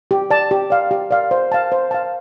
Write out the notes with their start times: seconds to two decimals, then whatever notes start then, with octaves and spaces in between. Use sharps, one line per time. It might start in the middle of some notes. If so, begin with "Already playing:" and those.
0.11 G4
0.30 D5 A5
0.51 G4
0.70 D5 F5
0.91 G4
1.11 D5 F5
1.31 C5
1.52 F5 A5
1.72 C5
1.91 F5 A5